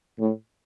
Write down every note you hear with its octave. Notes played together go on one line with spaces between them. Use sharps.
A2